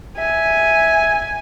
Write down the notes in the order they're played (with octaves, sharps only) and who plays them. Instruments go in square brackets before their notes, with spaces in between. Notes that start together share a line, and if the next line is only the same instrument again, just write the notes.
[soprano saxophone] E5 [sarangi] G#5